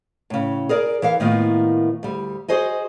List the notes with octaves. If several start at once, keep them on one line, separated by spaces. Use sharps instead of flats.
A2 C#3
G#4 A#4 D5
E3 A#4 F5
A2 D#3 A#3 B3 F4
D2 G3
F#4 G#4 C5 D#5 G#5